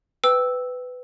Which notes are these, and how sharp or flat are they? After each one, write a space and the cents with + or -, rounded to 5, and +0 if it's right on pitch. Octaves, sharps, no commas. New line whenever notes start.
B4 +20 G5 +0 E6 -5